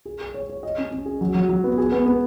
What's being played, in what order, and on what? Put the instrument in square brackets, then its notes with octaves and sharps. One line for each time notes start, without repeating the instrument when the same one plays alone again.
[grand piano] G#4
G#4
C#5
C#5
D#5
C#4
C#4
G#4
F#3
F#3
F#3
B3
G#4
B3
B3